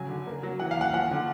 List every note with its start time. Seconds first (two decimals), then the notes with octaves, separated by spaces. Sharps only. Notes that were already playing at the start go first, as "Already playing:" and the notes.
Already playing: C#3 F#3 G#5
0.09 D3
0.27 A#3
0.43 F#3
0.59 E3 F#5
0.71 F5
0.77 D#2 F#5
0.93 F3 F#5
1.11 D3